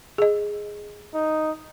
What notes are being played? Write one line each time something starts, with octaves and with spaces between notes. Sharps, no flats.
G#4 D#5
D#4